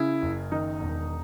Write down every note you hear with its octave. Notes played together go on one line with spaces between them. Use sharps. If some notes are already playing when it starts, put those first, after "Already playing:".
Already playing: C#3 E4
F#1
D#3 D#4
E1